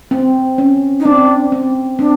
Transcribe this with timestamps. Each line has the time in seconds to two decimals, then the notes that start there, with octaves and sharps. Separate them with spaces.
0.11 C4
0.58 C#4
1.00 D#4
1.05 C4 D4
1.52 C4
1.99 C4 D4